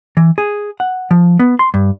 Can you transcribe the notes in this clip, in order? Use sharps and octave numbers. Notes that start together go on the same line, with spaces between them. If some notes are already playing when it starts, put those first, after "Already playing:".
E3
G#4
F#5
F3
B3
C6
G2